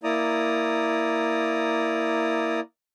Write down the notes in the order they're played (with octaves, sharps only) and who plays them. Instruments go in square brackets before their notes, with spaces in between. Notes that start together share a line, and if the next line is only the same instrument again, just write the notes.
[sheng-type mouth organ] A#3 E4 D5 A#5 D#6